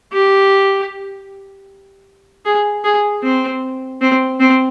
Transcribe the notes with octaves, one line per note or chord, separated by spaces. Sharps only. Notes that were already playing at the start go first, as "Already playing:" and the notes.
G4
G#4
G#4
C4
C4
C4